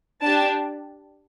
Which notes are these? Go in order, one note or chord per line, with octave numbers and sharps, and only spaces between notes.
D4 G4 A5